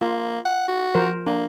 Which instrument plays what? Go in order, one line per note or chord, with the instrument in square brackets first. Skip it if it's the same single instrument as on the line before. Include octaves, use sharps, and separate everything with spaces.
[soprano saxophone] A#3 [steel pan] F4
[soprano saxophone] F#5
F#4
[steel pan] F3 A#4 C5
[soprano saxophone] A#3 [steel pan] D4